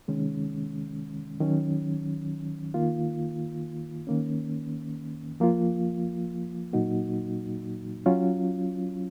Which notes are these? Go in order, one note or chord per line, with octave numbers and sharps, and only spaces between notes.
C3 D#3 G#3 C#4
D#3 F#3 C#4
D#3 A#3 F4
D#3 A#3 C#4
F3 A#3 F4
A#2 F#3 A#3 D#4 F#4
F#3 C#4 F4